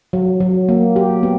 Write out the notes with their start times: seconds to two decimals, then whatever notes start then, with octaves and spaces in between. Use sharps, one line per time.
0.13 F#3
0.40 F#3
0.69 A#3
0.96 G4
1.23 B3